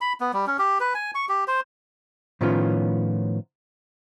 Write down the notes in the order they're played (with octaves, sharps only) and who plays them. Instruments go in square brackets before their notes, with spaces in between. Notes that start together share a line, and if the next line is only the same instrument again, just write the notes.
[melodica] B5
B3
G3
C#4
G4
B4
G#5
C#6
G4
C5
[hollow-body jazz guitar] A2 D#3 F3 B3 C#4 F4